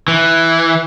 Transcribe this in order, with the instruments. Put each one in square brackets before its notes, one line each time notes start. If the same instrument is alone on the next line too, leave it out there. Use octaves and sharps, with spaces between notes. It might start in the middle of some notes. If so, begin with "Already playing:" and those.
[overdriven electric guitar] E3